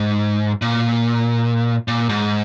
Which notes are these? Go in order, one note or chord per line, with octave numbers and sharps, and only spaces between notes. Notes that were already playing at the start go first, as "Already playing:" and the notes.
Already playing: G#2
A#2
A#2
G#2